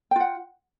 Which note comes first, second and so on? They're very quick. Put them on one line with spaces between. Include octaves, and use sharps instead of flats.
G5 F4 F#5